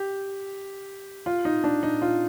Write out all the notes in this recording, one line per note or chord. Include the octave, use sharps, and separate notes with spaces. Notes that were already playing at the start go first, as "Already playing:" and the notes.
Already playing: G4
F4
D#4
D4
D#4
F4